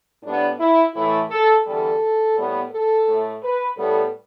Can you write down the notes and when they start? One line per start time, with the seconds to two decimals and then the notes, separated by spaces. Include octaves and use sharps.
0.23 A2 G3 B3 D4
0.59 E4
0.94 A2 E3 A3 E4
1.30 A4
1.65 E2 D3 G3 A4
2.36 A2 G3 B3
2.71 A4
3.07 A2 A3
3.43 B4
3.78 A2 G3 B3 A4